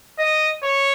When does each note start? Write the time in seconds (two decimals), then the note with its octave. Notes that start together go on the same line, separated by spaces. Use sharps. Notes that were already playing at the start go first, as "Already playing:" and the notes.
0.19 D#5
0.63 C#5